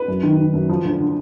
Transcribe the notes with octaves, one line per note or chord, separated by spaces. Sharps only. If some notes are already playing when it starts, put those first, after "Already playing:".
Already playing: B4
F#2
D#3
D#3
F#2
F3
D2
D3